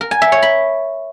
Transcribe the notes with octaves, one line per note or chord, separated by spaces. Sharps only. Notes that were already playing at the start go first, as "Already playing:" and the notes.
A#4
G#5
E5
C#5
B5